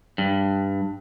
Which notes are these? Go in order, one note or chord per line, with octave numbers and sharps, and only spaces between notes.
G2